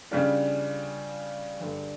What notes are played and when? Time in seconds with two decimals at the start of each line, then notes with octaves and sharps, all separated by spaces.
0.11 C#3 G3 D4 F4
1.60 G2 D3 G3